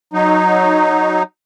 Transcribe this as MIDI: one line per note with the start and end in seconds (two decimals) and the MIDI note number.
0.14 1.23 54
0.14 1.23 63